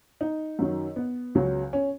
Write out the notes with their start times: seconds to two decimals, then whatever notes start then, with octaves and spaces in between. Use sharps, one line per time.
0.21 D#4
0.59 F#2 D#3 F#3
0.96 B3
1.35 C#2 C#3 F#3
1.73 C#4